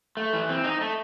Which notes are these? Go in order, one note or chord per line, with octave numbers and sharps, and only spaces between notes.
A3
E3
C4
D#4
A3